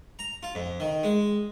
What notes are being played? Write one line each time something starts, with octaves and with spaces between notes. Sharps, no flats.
A#5
F4
F2
D#3
G#3